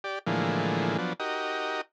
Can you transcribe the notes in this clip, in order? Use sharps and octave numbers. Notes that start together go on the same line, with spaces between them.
G4 D5
A2 D3 E3 F3 G#3 A#3
F3 F#3 B3 D4
D#4 F#4 G4 A#4 D#5